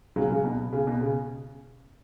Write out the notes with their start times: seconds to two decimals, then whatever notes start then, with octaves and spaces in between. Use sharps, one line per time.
0.16 C#3 F#3
0.30 C#3
0.44 B2
0.73 C#3
0.87 B2
1.01 C#3